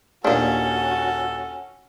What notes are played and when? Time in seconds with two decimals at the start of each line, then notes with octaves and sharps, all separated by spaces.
0.25 D#2 A#2 A#3 C#4 D4 F#4 A4